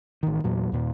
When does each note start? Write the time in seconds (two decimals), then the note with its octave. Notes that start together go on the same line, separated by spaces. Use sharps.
0.23 A1 D#3
0.44 E2 A#2 F#3
0.72 D#2 A#2